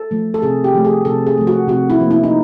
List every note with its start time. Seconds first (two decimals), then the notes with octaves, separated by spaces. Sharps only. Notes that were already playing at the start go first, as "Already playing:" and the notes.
Already playing: A4
0.11 F3 A3
0.34 A4
0.42 C3 G#4
0.64 G4
0.74 F3 A3
0.85 G#4
1.05 C3 A4
1.27 G#4
1.38 F3 A3
1.47 F#4
1.68 C3 F#4
1.90 E4
2.00 F3 A#3
2.11 E4
2.23 D#4